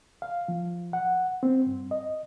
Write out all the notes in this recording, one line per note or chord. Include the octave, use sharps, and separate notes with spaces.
F5
F3
F#5
C4
G2
D#5